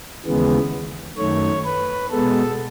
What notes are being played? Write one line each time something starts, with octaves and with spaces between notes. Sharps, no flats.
D#2 C#3 E3 G#3 B3
F#2 D#3 A3 C#5
B4
B2 G#3 B3 A4